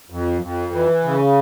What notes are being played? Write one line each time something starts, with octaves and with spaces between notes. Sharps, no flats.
F2
F2
E3
C#3